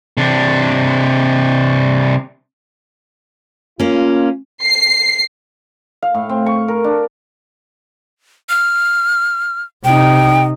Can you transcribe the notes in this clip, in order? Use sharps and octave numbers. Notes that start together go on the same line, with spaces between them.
C3 D4
A#3 C#4 F4
C7
F5
A2
C4
C#6
A#4
D4
F6
C3 D#4 G5